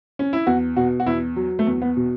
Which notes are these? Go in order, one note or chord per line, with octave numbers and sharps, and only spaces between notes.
C#4
E4
E2 F#4
B2 F#4
F#4
E2 E4
F#3
A3
E2
B3
B2